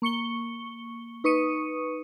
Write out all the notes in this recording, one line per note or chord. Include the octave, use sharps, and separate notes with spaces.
A#3 C#6 C#7 G7
D#4 B4 C#6 D#6 C#7 D#7